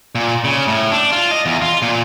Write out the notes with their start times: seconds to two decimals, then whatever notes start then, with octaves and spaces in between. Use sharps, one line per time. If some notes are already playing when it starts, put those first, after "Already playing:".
0.15 A#2
0.44 C#3
0.68 A2
0.91 D4
1.12 F4
1.31 D#5
1.46 E2
1.62 F4
1.82 A#2